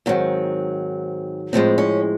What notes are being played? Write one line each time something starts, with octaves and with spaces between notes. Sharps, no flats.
G#2 D#3 F#3 C4
A2 F3 G#3 C4
C#4